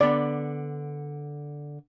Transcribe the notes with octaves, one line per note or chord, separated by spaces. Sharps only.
D3 B3 D5